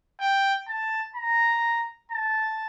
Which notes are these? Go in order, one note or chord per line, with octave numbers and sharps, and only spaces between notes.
G5
A5
A#5
A5